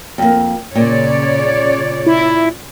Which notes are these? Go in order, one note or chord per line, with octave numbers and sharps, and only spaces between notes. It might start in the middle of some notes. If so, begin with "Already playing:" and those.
F2 A#3
A#2 C#3 C#5 D5
E4